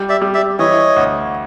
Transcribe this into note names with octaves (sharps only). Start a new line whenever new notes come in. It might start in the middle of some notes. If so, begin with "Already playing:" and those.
Already playing: G3
D5 E5
G3
D5 E5
E3 C#5 D#5
D2